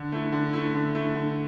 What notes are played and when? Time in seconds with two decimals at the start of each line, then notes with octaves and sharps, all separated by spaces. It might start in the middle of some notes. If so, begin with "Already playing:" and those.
Already playing: D3
0.12 A3 E4
0.32 D3
0.53 A3 E4
0.75 D3
0.95 A3 E4
1.15 D3